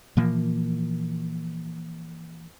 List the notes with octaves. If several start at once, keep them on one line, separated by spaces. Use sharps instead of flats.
A#2 E3 F3 A#3